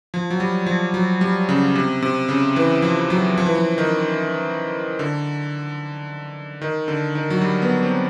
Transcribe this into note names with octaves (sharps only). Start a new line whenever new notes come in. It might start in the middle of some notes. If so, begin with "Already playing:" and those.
F3
F#3
G3
F3
F#3
G3
C#3
C3
C3
C#3
E3
F3
F#3
F3
E3
F3
D#3
D3
D#3
D3
D#3
F#3
G3
B3
C4